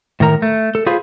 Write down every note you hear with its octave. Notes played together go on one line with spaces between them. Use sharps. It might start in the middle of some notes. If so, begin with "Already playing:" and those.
A2 D#3 A#4 A#5
A3
A4
F4 G#4 B4 C5 F5